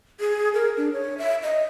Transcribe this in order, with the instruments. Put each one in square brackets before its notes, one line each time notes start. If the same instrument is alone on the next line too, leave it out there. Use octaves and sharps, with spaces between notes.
[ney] G#4
A#4
D4
C#5
E5
D#5